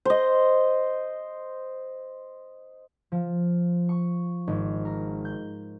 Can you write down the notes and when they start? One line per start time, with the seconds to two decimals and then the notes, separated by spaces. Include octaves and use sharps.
0.05 C5 D#5
3.12 F3
3.89 C#6
4.47 G#1
4.85 A#4
5.25 G6